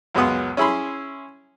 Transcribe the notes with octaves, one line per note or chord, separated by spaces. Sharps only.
C#2 F#2 F#3 G#3 B3 D#6
C#4 E4 G#4 B5 C6